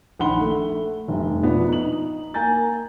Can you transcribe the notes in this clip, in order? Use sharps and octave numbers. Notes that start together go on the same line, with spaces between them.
A#1 D#3 F#5 B5 C6 G7
A3
F1 G2 C3
B2 F3 B3 D4
D#4 F#7
A#3 G#5 A#5 G6 A6